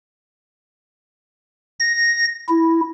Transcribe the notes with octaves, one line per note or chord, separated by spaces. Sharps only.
A#6
E4